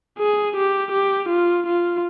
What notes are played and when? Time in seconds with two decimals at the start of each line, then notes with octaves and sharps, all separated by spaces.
0.19 G#4
0.56 G4
0.92 G4
1.29 F4
1.66 F4